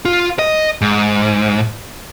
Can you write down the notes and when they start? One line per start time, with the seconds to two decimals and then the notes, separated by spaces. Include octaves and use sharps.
0.05 F4
0.39 D#5
0.81 G#2